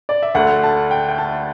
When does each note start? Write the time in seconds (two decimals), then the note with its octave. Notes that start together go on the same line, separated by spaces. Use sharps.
0.09 D5
0.22 E5
0.35 D2 D3 A3 F#5
0.63 A5
0.91 G5
1.09 G5
1.18 A5